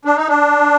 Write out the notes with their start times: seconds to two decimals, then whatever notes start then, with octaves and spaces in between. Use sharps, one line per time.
0.05 D4
0.17 D#4
0.28 D4